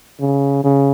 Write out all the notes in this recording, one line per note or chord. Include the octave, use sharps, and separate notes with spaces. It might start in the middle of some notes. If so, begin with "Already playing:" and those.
C#3
C#3